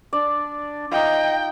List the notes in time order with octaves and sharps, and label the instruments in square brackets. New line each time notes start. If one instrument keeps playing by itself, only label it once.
[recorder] D4 [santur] D5
[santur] D#4 F4 [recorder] D#5 [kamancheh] G5